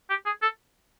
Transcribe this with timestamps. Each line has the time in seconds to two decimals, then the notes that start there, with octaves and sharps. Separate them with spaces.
0.10 G4
0.26 G#4
0.42 A4